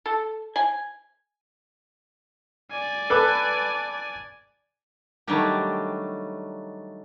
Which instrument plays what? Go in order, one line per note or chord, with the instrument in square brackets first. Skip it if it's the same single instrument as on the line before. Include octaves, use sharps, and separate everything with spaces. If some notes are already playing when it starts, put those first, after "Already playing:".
[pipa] A4
G#5
[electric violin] D5 G#5
[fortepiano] A4 B4 D6
[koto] D#3 F#3 G3 A3 D4 G4